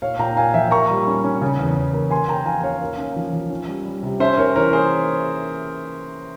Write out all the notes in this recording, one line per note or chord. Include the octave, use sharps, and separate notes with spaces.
A#2 C#5 F5
A#2 G5 A#5
A#3 F5 G#5
F3 E5 G5
A#3 A#5 C#6
G3
C#4
C#4
C#3
E2
E2
A#3
A#3 G#5 C6
A#3 G5 A#5
F3 F5 G#5
C#4 C#5 F5
A#3
C#4
F3
F3
C#4
G3
G3
C3
C#4 C5 E5
C#4 A#4 C#5
E3 A#4 C#5
A#3 G#4 C5